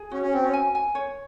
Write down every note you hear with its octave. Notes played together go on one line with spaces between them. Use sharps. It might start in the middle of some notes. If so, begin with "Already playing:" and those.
Already playing: G#4
C#4 F#4
C#4
C4 F#4
C#4
G#5
G#5
C#5